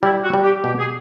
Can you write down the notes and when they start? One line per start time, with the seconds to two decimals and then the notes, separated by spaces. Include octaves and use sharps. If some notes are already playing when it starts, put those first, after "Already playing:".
0.03 G3 E4
0.24 F#4
0.34 G3
0.43 G4
0.64 B2 G4
0.79 G#4